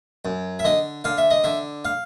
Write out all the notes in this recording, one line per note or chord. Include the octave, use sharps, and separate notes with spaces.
F#2
E5
D3 D#5
D3 F5
E5
D#5
D3 E5
F5